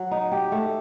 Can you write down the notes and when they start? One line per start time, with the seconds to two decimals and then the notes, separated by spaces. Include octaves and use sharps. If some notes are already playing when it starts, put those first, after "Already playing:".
Already playing: F#3
0.11 D#4
0.32 G4
0.52 A3